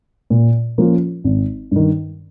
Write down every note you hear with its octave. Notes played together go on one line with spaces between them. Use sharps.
A#2
F3 A#3 C#4 F4
G#1
G2 D#3